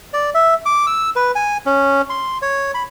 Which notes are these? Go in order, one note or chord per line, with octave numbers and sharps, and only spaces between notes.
D5
E5
D6
E6
B4
G#5
C#4
C6
C#5
B5